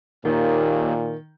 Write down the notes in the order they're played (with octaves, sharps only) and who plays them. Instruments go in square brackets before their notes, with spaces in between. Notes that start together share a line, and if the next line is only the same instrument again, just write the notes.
[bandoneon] D#2 [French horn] A#2 [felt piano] D#3